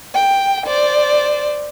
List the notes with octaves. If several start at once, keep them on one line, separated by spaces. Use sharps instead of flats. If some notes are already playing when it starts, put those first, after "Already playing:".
G5
C5 D5